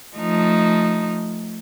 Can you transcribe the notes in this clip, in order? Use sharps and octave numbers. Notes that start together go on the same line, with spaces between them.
F3 A3 D#4